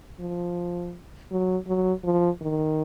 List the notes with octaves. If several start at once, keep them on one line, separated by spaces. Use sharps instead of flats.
F3
F#3
F#3
F3
D#3